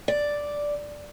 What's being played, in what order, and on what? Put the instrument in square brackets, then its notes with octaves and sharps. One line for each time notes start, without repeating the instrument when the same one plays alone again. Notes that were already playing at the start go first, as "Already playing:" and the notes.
[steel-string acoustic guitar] D5